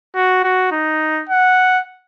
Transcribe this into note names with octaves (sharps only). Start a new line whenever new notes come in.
F#4
F#4
D#4
F#5